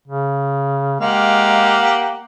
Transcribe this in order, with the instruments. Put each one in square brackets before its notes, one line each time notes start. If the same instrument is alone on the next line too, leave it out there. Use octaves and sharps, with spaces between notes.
[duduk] C#3
[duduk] G#3 [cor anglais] A#3 [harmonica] G4 F5 F#5